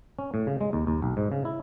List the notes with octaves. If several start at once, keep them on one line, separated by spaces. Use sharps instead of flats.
C#4
A2
C#3
G#3
D#2
D#2
B1
G#2
C#3
E4